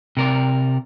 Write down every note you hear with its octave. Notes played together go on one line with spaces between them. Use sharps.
C3 A#4 D5